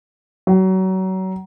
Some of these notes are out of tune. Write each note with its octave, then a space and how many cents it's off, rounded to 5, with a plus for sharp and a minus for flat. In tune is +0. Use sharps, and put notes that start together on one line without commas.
F#3 +30